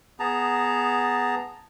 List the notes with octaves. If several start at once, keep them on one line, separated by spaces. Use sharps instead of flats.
B3 G#4 A5 A#5